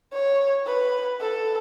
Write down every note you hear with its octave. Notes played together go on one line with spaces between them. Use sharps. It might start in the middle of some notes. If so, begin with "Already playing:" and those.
C#5
B4
A4